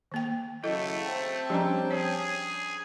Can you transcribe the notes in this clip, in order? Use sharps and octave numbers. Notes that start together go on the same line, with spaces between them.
D#3 A#3 G5
C#3 F#3 A3 E4 A4 D#5
C4 G5 A5
F3 G3 C#4 D4 D5 A#5
G#4 C#5